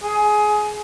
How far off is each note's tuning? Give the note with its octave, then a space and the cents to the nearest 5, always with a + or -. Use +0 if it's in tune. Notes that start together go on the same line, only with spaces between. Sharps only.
G#4 +20